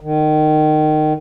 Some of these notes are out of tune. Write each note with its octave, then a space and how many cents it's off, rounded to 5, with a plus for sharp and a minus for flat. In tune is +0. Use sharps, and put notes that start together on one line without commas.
D#3 -25